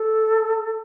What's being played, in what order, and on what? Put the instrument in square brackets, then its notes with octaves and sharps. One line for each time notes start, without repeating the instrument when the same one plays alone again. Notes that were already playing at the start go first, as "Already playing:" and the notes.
Already playing: [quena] A4